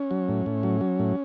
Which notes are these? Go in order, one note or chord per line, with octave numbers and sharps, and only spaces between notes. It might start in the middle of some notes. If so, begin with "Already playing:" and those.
Already playing: C#4
F#3
A2
A2
F#3
F#3
A2